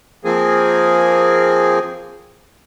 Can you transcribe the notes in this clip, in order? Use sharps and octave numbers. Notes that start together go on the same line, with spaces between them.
F3 A#3 C4 G#4